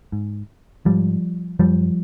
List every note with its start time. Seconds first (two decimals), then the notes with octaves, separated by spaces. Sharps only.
0.12 G#2
0.85 G#2 F3 G3
1.59 F#2 F3 G3